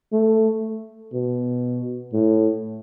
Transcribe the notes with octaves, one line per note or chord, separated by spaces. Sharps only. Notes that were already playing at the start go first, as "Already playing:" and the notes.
A3
B2
A2